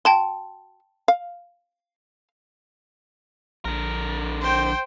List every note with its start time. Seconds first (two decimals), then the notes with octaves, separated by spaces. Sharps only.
0.05 F#4 G5 A5 C6
1.08 F5
3.65 A#1 D3 A#4
4.41 C5 G5